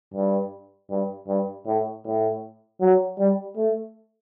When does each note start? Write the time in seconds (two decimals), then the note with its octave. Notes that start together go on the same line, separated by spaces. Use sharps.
0.14 G2
0.90 G2
1.28 G2
1.66 A2
2.05 A2
2.81 F#3
3.18 G3
3.56 A3